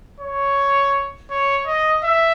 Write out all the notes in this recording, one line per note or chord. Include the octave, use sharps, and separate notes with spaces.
C#5
C#5
D#5
E5